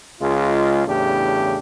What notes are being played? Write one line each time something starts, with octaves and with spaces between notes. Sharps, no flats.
C#2 G#3 F4
E2 A2 C#3 D4 G4